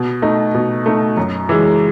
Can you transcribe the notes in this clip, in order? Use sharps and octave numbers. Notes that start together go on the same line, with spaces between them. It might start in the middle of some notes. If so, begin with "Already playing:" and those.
Already playing: B2
A3 D#4
B2
A3 D#4
F#2
E3 G#3